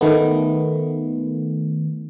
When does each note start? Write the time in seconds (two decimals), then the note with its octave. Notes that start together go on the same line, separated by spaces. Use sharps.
0.01 D#3 A3 B3